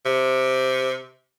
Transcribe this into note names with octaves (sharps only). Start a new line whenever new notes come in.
C3